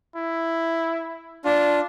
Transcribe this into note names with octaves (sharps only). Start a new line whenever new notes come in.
E4
D4 F4